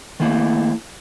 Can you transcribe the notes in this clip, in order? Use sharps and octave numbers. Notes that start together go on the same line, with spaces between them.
D#3 A3 A#3 E4